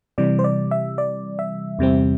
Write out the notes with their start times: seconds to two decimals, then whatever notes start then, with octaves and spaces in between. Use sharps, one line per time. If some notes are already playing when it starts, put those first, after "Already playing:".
0.18 C3 E3 G3 D5
0.39 C5
0.44 D5
0.71 E5
0.98 D5
1.39 E5
1.79 E2 C3 G3 C4